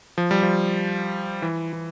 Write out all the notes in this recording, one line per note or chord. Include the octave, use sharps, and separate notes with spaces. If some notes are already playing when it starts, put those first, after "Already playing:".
F3
G3
F3
E3
E3